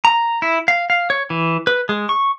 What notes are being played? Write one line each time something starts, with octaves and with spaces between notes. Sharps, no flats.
A#5
E4
F5
F5
C#5
E3
B4
G#3
C#6